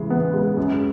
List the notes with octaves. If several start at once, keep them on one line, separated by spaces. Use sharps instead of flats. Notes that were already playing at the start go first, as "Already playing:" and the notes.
Already playing: C#3 E3 G#3
B3
G#3
F#2